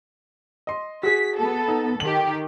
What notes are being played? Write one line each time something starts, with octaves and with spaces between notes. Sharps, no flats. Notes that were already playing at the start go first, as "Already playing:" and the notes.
D#5 C6
F#4 G#4 B6
B3 A4
D#4
D#3 G4 F#7